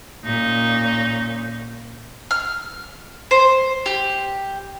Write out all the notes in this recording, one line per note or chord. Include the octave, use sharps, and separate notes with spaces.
A#2 C#4 D#4
F6
C5
G4